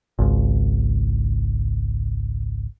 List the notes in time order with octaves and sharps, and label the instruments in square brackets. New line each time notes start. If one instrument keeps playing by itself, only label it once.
[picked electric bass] G#1 C#2